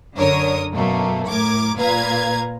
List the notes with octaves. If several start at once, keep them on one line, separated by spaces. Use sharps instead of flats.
F#2 D3 A#4 C#5 D#6
F#2 B2 A3 A#3
A2 A#4 D6 G#6
A#2 B4 F5 A#5 G#6